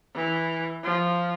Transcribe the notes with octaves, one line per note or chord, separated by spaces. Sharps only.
E3
F3